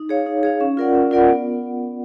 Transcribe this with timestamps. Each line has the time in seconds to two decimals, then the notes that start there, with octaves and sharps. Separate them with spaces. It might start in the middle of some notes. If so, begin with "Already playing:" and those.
Already playing: D#4
0.09 G#4 C#5 F5
0.26 D#4
0.43 G#4 C#5 F5
0.61 C#4
0.77 F4 A#4 D5 F#5
0.95 C#4
1.11 F4 A#4 D5 F#5
1.28 B3